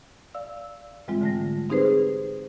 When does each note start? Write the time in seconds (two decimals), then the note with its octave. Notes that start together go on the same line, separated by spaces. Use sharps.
0.35 D5 F5 E6
1.08 G#2 E3 G3 G#3 C4 F4
1.21 D3 A3 A#6
1.70 C4 D#4 G4 G#4 B4 C5